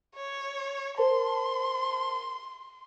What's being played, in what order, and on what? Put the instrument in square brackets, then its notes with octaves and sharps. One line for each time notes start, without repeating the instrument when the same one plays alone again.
[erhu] C#5
[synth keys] A#4 C5 A5 [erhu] C6